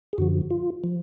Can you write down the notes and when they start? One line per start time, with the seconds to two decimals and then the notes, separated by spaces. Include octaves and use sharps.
0.13 G#4
0.18 F#2 D3 F3 F#4
0.51 F4
0.84 F3